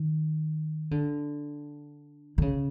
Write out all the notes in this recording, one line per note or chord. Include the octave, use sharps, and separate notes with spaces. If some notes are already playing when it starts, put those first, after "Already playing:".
Already playing: D#3
D3
D3
C#3